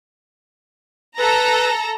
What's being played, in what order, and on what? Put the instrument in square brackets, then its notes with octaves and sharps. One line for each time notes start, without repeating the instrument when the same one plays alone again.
[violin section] A4 A#5 [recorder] B4